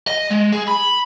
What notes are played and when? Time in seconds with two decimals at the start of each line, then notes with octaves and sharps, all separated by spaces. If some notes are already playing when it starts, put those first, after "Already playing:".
0.07 D#5
0.31 G#3
0.53 G#4
0.68 B5